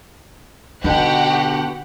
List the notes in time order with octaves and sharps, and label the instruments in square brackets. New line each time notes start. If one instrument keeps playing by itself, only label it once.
[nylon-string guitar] B2 D3 [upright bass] D#4 [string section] F#4 G4 F#5